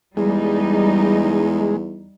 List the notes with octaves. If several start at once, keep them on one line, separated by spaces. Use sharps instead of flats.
E2 G3 G#3 D#4